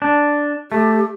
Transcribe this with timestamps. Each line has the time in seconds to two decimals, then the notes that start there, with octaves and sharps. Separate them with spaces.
0.02 D4
0.72 A3 G4